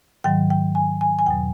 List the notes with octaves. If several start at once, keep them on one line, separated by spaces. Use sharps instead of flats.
G#2 D#3 F#3 G5
G5
G#5
G#5
G#5
E2 B2 F#3 G5